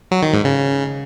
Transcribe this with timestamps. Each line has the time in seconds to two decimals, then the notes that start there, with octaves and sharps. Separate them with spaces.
0.11 F#3
0.23 D#3
0.34 G#2
0.45 C#3